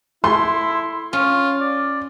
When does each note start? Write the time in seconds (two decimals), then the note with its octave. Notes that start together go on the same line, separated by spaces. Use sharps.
0.24 A3 E4 C6
1.13 C#4 F4
1.60 D5